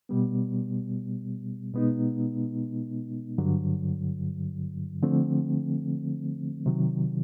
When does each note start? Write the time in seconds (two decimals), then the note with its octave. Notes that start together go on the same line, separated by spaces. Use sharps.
0.09 B2 G3 B3
1.73 B2 G#3 B3 D#4
3.38 G2 D3 F#3
5.02 D3 F3 A3 C4
6.66 C3 D#3 F#3